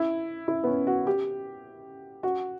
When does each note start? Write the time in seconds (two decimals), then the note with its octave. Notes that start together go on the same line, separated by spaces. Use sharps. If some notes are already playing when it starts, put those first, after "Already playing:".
Already playing: E4
0.48 E4
0.64 B3
0.67 C#4
0.87 F#4
1.07 G4
2.23 F#4